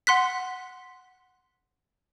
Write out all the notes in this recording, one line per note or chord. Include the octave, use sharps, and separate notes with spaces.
F#5 C6 F#6 B6